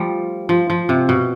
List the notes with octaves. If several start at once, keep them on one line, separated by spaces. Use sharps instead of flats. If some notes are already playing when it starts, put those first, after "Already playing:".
Already playing: F3 G3 A3
F3
F3
C3
B2